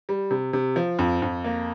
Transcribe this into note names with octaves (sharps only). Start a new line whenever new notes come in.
G3
C3
C3
F3
F2
F2
A#3